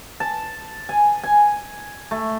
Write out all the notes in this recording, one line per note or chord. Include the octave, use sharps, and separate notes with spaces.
A5
G#5
G#5
A3